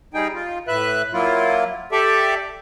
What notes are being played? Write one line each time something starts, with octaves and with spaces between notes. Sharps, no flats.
G3 D#4 G#4 G5
F4
A2 B4 E5 F#6
F#3 A#3 E4 F4
G4 A4 D5 E5